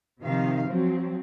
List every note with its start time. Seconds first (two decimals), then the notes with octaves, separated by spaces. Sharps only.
0.21 C3 D#3 F3 F5
0.66 F3 F#3 C4